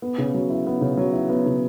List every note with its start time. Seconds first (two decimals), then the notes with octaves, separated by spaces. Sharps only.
0.02 B3
0.18 C#3
0.34 F#3
0.50 E4
0.67 B3
0.81 C#3
0.97 F#3
1.13 E4
1.29 B3
1.46 C#3